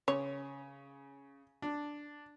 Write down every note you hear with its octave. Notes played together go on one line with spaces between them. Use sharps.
C#3 C#5
D4